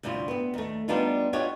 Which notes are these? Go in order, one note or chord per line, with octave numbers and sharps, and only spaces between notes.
D2 G2 C3 E4 F4
B3 C4
D#2 A3
G3 B3 D4 D#4 F4
F4 G4 C#5 D#5 F#5